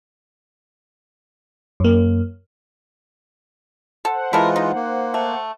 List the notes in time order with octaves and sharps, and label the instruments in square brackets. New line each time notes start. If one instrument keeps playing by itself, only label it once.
[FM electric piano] F#2 A#3
[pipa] A4 [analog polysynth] C5 F#5
[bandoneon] E3 G#3 F4 [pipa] E4 A4 A#4
[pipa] D#4
[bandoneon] A#3
[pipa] A3